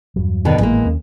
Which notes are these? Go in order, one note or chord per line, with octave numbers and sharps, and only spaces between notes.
E2 G2 F#3
B2 D3 D#3
G#1 A2 E3 G#3 A#3 B3
D#2 C#4